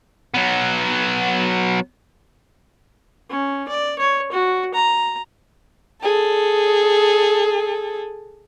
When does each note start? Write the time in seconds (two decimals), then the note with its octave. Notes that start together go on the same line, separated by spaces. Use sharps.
0.34 F#3 B3
3.30 C#4
3.68 D5
3.99 C#5
4.32 F#4
4.74 A#5
6.03 G#4 A4